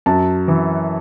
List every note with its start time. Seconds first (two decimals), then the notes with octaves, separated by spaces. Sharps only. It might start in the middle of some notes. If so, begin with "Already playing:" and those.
0.06 F#2 A5
0.48 E3